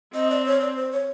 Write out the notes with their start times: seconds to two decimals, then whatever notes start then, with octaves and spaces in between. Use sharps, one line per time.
0.14 C4 D#5
0.30 D5
0.46 C#5
0.61 D5
0.76 C5
0.92 C#5